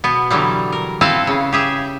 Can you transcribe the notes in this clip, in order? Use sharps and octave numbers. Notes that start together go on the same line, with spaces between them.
B2 B3
D3 E3 F#3 G3
A#4
C4 E4 A4 B4 F5
C#3
G4 G#4 E5